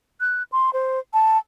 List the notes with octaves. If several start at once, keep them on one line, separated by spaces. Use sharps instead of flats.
F#6
C6
C5
A5